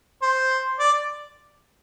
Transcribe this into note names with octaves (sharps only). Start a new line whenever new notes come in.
C5
D5